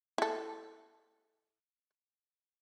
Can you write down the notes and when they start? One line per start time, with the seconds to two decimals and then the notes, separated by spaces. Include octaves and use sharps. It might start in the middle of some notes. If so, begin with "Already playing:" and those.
0.18 E4 A4